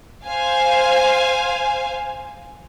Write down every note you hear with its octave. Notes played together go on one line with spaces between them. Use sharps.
C5 F5 G#5